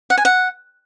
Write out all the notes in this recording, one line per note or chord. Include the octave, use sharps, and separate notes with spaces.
F#5
G#5
F#5